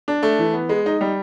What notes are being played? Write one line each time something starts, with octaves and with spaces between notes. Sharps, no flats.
D4
A3
E3
B3
G#3
D#4
G3